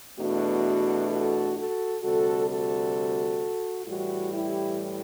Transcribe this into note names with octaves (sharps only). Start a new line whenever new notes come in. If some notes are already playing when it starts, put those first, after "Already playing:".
E2 B2 A3 D4 F#4
F#4 A4
F#4 A4
D2 C3 G3 F#4 A4
F#4 A4
A2 E3 G3 F#4
E4 G4